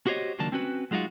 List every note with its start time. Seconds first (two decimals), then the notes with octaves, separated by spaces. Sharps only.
0.07 F#4 G4 C5 C#5 D#5
0.38 C#2 D#3 F#3 A#3 D4 A5
0.52 C4 C#4 F#4 B4
0.91 F#3 G#3 D#4 F4 F#4